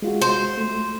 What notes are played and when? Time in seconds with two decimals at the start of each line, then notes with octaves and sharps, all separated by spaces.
0.02 G#3 F4 F#4
0.21 C5
0.58 A3